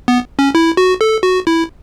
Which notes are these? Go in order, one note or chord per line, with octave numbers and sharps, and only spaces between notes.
B3
C#4
E4
F#4
A4
F#4
E4